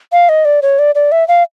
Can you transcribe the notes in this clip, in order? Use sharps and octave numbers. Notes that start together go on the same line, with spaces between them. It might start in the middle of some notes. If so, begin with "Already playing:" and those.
F5
D#5
D5
C#5
D5
D5
E5
F5